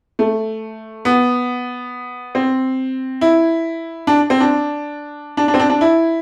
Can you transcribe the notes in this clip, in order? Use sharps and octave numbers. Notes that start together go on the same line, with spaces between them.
A3
B3
C4
E4
D4
C4
D4
D4
D4
C4
D4
D4
E4